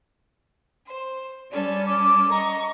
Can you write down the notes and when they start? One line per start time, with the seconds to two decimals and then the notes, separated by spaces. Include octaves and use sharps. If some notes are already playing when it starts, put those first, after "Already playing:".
0.87 C5
1.52 G3 C#4 A4 D5
1.86 D6
2.31 D#5 A#5 C#6